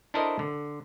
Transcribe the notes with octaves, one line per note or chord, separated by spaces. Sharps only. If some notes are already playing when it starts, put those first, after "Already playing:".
D4 E4 A4 A#4 C5 D#5
D3